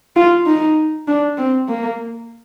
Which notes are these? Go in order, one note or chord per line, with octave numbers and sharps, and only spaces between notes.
F4
D#4
D4
C4
A#3